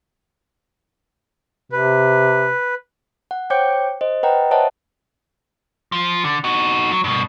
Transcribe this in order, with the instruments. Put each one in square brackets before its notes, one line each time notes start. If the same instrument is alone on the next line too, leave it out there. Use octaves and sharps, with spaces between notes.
[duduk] C3 [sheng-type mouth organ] B4
[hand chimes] F#5
C5 C#5 G5 D6 G6 C#7
C5 D#5
B4 D#5 F#5 G5 A#5
C5 C#5 D#5 E5 F#5 A5
[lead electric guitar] F3
D3
D#4 F#4
F#3
G2 B2